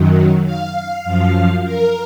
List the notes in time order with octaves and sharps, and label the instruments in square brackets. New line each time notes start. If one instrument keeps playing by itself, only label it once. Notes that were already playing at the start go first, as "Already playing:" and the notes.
Already playing: [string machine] F#2 D#3 F#3
F5
F#2 F3
A#4